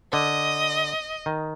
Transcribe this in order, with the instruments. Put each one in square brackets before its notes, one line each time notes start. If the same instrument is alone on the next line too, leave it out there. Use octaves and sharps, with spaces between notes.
[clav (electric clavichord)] D3 [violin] D#5
[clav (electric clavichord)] D#3